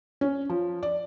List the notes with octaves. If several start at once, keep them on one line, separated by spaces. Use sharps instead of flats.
C#4
F3
D5